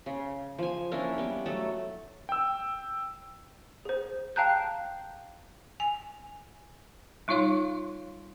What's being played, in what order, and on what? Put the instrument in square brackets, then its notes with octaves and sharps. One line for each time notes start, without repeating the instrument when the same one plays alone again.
[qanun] C#3
F3 G#5
A#3 C#4 D4 E4
G3 B3
F#3 A3 A4
[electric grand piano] G5 E6
[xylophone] G#4 C5
F5 G5 A5 A#5 F#6 G6
[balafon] G#5
G3 D#4 F4 C#5 F5 C6